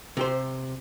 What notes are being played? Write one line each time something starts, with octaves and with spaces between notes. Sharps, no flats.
C3 G4 C5